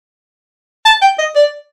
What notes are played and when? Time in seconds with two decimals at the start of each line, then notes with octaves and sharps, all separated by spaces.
0.85 A5
1.02 G5
1.19 D#5
1.36 D5